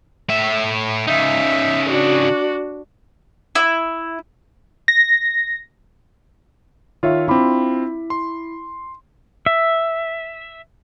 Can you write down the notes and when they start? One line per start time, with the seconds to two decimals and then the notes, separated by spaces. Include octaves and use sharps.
0.29 A2 E5
1.07 C#3 D#4 E5
1.89 D4 F#4
3.55 E4
4.88 A#6
7.03 D#3 F4 C#5 E5
7.28 C4 D4 E4 F4 B5 D6
8.10 C6
9.46 E5